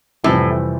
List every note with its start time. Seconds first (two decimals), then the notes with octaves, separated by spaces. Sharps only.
0.24 F2 A2 C3 E3 G3 C4